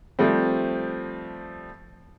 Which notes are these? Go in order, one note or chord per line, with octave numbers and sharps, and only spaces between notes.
F3 G3 A3 C4